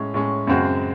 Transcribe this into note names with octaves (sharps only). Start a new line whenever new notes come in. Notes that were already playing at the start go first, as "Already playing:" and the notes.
Already playing: A2 G#3 C#4
A2 G#3 C#4
F#2 C#3 G#3 C4 F#4